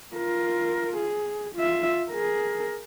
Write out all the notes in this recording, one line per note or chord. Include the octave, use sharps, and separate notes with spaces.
F4 A#4
G#4
F4 E5
G#4 A#4